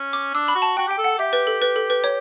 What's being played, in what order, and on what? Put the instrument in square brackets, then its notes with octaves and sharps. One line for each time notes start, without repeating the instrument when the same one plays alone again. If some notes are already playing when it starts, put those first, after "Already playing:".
Already playing: [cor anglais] C#4
[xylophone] D6
[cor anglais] D4 [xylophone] E6
[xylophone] B5
[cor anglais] F#4
[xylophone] A5
[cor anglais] F#4 [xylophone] G5
[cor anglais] G4 [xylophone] G5
[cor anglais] A4
[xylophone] F#5
[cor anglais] G4 [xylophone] E5
[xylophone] B4
A4
B4
A4
B4
C#5